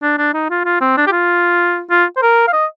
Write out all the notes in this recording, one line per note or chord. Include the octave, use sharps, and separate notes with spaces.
D4
D4
D#4
F4
F4
C4
D4
G4
F4
F4
C5
A#4
F5
D#5